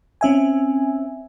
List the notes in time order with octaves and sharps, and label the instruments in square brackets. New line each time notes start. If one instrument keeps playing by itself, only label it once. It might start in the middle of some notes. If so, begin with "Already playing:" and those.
[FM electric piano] C4 C#4 E5 G#5